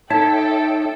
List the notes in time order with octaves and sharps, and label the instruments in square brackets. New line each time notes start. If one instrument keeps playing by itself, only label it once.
[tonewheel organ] D#4 C#5 E5 [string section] A4 G5 [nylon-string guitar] A5